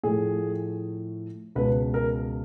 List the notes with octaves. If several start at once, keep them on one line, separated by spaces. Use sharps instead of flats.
A2 F3 A3 G#4
C#2 B2 G#3 B4
A#4